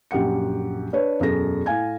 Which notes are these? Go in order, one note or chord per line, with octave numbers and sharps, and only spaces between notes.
A#1 F#2 G4 F#5 C#7
D4 B4 C#5
E1 F#2 G#4 A4 A#6
A2 F5 G#5 G#6